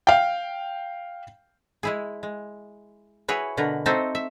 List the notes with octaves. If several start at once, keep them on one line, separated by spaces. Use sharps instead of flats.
F5 G5
G#3 E4 G#4
G#3
E4 F#4 G#4 B4 C#5
B2 D3 A#4 B4
C4 D#4 F#4 A4 C5 E5
E5